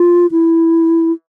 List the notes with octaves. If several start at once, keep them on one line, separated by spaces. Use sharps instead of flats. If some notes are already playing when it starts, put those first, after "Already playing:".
Already playing: F4
E4